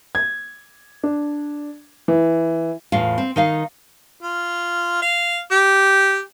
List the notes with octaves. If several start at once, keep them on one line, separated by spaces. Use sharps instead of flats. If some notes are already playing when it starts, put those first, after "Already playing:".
G#6
D4
E3
E2 A2 F4 F5
C4
D#3 D#4 F5
F4
F5
G4